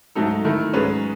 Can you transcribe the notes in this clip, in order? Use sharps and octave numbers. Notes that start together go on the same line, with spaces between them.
G#2 F#3 A3 D#4 A4
D#3 A3 E4
G#2 F#3 C#4 G#4 B4